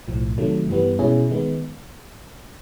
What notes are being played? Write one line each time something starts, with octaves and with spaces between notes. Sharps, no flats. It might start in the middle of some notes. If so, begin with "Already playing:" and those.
B1 A2 F3
C3 D#3 F#3 A3
G2 E3 G3 B3
B2 G#3 C#4 E4 G#4
D#3 G#3 B3